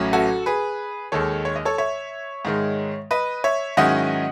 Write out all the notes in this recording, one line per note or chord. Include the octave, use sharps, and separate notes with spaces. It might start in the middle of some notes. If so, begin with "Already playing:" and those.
Already playing: A1 A2 F#3 C#4 E4
F#4 A4
G#4 B4
D#2 D#3 G#3 A4 C#5
C#5
D#5
A4 C#5
C#5 E5
G#2 D#3 G#3
B4 D#5
C#5 E5
G#2 D#3 F#3 C#4 E4 D#5 F#5